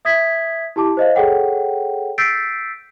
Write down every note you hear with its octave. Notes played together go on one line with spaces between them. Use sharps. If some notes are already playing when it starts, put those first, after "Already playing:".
E5 D#6 G#6 B6
E4 G4 A5 D6
C5 D#5 F5
G#4 A4 C#5 F#5 G5
E6 G6 A6 B6 C7 D7